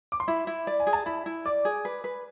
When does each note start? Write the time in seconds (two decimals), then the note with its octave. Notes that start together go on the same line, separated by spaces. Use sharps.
0.12 D6
0.20 C6
0.28 E4 B5
0.47 E4
0.67 D5
0.80 G#5
0.87 G#4
0.93 A5
1.06 E4 B5
1.26 E4
1.45 D5 D6
1.65 G#4
1.85 B4
2.04 B4